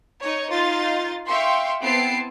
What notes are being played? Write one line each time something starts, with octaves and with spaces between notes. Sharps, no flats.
D#4 C#5
D#4 F4 C6 A6
E5 F5 G5 C6 C#6
B3 C4 E4 A5 C7 D7